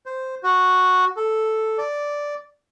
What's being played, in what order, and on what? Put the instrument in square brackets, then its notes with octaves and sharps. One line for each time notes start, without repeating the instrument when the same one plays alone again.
[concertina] C5
F#4
A4
D5